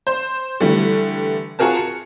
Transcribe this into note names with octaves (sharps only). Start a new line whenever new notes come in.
C5
D3 E3 G3 A3
F4 F#4 G#4 A#4 A5
C#7